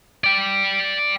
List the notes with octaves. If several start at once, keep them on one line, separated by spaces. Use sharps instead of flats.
D5 G5